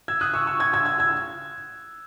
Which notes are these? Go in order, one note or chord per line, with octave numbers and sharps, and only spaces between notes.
E6 G#6
D#6 F#6
C#6 E6
C#6 E6
E6 G#6
E6 G#6
E6 G#6
E6 G#6